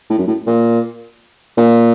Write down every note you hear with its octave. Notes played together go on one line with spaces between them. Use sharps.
A2
F#2
A2
A#2
A#2